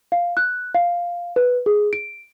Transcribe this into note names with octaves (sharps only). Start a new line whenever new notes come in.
F5
F#6
F5
B4
G#4
D7